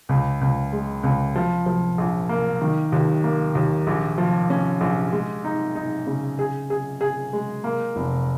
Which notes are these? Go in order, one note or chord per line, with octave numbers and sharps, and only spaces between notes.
C#2
C#2
G#3
C#2
F3
F3
A#1
A#3
D#3
D#2
A#3
D#2
A#1
F3
C#4
A#1
G#3
D#4
D#4
C#3
G#4
G#4
G#4
G#3
A#3
F1